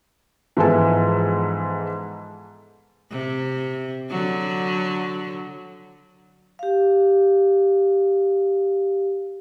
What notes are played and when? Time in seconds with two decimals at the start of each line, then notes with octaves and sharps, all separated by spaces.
0.57 G#2 E3 F3 B3 A4 G#5
3.11 C3
4.11 D3 F#3
6.59 G4 F5